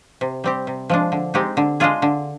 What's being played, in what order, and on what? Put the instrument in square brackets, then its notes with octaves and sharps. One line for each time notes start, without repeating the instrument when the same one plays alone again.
[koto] C3
G3 C4 G4
C3
F3 G#3 D4
D3
G#3 C4 D#4 G4
D3
G#3 D4 F4 G#4
D3